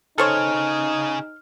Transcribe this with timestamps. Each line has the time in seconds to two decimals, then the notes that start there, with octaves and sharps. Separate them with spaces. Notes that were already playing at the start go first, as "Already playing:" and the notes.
0.18 C#3 D#4 G#4 A4 C5 C#5 F6